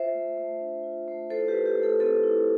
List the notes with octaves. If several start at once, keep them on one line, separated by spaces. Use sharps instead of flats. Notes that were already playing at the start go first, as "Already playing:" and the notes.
Already playing: F4 C5 E5
A3
A3
D4
F4
A3
E4 A4 C5
G4 B4
A3
G4
A3
A4
C4 A4
E4